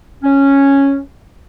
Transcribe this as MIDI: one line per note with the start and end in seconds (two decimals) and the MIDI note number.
0.23 0.98 61